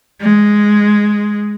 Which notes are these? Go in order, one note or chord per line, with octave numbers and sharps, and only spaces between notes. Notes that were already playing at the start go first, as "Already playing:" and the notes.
G#3